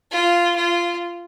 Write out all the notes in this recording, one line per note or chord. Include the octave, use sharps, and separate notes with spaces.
F4
F4